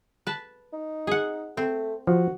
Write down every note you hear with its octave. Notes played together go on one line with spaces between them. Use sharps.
B4 A5
D#4
G#4 F#5
A3 C4
F3 F#4